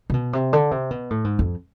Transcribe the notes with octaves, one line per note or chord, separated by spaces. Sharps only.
C3
B2
C3
D3
C3
B2
A2
G#2
F2